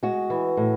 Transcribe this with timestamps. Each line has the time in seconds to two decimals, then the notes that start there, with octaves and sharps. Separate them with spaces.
0.03 G#3 F#4
0.30 E3
0.57 A2